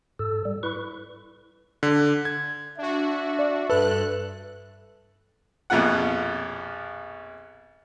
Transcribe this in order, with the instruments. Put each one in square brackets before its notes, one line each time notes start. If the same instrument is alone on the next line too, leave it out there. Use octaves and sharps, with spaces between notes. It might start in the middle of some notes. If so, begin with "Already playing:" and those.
[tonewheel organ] G#2 A4
G3
E4 B4 C#6
[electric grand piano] D3
G#6
[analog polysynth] D4 F#4 [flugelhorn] E5
[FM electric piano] D5
[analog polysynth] G2 F#6 [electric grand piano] A4 [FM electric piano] B4
[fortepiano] A#1 F2 B2 F4 F#5